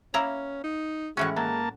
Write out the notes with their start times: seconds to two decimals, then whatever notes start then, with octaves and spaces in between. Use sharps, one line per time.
0.14 A#3 C#4 E4 A#5
0.64 D#4
1.17 A2 E3 G#3 C#4 F#4 C#6
1.36 F#3 A#3 A5